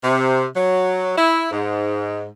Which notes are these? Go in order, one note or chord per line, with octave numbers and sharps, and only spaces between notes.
C3
F#3
E4
G#2